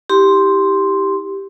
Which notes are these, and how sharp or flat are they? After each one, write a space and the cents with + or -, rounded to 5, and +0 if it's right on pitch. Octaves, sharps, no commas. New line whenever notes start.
E4 -30 G4 +0 C6 +0